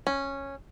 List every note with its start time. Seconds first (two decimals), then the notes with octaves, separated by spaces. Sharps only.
0.07 C#4